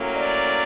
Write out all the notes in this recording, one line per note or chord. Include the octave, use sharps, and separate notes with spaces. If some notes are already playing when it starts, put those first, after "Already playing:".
Already playing: A2 F#3 A#3 C#4
D5